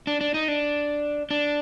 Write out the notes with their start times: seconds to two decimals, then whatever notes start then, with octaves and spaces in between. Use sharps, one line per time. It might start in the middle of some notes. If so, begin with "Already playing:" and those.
0.07 D4
0.21 D4
0.34 D#4
0.48 D4
1.31 D4